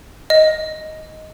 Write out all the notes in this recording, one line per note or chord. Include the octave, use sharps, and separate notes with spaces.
D#5